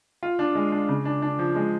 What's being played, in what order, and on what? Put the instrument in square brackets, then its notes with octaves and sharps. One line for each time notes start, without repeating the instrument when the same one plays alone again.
[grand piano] F4
D4
G#3
D4
C#3
D4
D4
F3
G#3